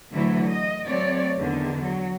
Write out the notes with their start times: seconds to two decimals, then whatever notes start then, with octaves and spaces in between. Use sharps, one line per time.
0.13 D2 D3 E3 F#3 E4
0.47 D#5
0.87 F#3 A3 C4 C#5 D5
1.37 E2 D3 D#3
1.82 F#3